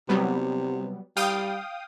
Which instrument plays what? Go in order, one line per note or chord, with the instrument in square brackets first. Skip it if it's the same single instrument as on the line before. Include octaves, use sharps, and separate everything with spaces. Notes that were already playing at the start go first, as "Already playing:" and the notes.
[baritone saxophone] C3 [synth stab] F#3 G3 B3
[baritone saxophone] G3 [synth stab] F5 G5 D#6